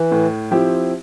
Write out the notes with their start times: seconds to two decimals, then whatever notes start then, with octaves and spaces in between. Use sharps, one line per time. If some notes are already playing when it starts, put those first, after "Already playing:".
Already playing: E3
0.11 A2
0.51 F3 C4 E4 G4